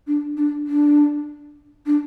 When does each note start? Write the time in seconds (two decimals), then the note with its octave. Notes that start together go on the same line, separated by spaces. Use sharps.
0.07 D4
0.37 D4
0.67 D4
1.86 D4